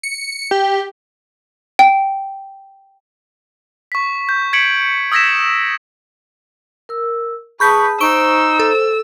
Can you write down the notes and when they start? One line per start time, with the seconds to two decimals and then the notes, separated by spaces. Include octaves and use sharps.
0.03 C#7
0.51 G4
1.79 G5
3.92 C#6 B6
4.29 G6
4.53 G#6 B6 C#7 D7 F#7
5.12 D#6 E6 G#6 A#6 B6 E7
6.89 A#4 E6
7.60 G#4 B4 A5 B5 C#6 D#6 G6 B6
8.00 D#4 C5 C#6 E6 D7 G7
8.59 A4